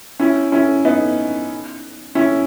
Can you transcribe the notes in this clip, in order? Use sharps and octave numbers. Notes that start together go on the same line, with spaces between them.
C#4 E4
C#4 E4
B3 D#4
C#4 E4